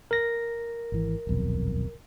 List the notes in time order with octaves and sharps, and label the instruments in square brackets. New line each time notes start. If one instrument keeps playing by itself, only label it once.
[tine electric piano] A#4 A#6
[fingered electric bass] G#1 E3
D#1 B1 F2